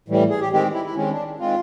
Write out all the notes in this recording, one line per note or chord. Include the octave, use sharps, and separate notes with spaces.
A2 E3 G3
G#4
G4
D#3 G#3 C4 G4
E4
E4
D#3 G#3 C4 C#4
D4
D#3 G#3 C4 F4